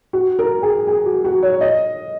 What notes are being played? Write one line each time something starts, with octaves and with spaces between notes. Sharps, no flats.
F#4
A#4
G#4
G#4
F#4
F#4
C#5
D#5